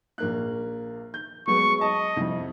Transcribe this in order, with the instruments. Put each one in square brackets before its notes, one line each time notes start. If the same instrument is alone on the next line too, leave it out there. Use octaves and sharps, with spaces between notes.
[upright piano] A#1 A#3 F#6
G6
[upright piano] F#3 G#3 B3 [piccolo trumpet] C#6
[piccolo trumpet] D#5 [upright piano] A5
[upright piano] C2 F2